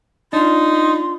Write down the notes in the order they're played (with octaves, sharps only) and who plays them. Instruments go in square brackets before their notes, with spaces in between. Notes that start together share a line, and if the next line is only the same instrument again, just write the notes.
[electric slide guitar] D4 F4 [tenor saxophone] D#4 [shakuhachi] C6